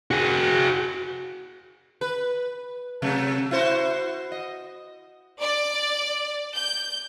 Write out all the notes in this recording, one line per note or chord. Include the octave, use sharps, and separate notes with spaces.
F#4 G#4
B4
C3 F#3 A3
E4 F#4 C5
D#5
D5
G6